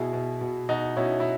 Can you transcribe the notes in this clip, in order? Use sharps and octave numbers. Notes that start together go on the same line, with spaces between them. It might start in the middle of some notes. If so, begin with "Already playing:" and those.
Already playing: B2 E4 G#4
B2
B2
B2 D#4 F#4
B2 C#4 E4
E4